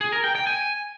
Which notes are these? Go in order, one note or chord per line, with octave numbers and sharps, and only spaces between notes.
G#4
A#4
G5
G5
G#5